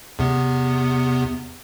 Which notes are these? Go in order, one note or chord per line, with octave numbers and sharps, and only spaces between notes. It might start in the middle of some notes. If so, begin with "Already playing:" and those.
E2 C3 B3